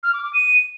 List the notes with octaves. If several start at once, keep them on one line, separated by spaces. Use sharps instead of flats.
F6
D6
D6
D#7